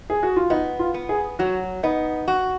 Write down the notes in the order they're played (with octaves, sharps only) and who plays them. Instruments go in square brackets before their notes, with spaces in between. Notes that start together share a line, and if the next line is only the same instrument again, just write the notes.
[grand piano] G#4
F#4
F4
[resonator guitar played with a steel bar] B3 [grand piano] D#4
[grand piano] F4
[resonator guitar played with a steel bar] B3
[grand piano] G#4
[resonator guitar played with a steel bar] F#3 [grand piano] F#4
[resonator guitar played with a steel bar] B3 [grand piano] D#4
[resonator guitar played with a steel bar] F#4